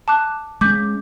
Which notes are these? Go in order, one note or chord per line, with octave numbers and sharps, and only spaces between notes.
A5 D6 F#6
G#3 C#4 D6 G6 B6